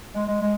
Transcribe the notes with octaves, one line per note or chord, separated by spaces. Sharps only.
G#3
G#3
G#3